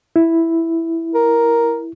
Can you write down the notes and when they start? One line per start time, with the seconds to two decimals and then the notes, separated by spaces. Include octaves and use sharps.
0.16 E4
1.15 A#4